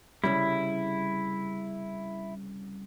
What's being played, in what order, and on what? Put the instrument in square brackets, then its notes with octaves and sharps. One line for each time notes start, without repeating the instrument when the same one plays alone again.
[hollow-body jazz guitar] C2 C#3 G3 [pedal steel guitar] E4